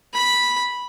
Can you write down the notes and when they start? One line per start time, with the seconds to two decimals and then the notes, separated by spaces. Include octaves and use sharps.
0.14 B5